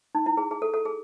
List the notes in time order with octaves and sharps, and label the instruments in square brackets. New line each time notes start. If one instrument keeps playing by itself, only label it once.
[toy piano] D#4
E4
G#4
G#4
A4
A4
G#4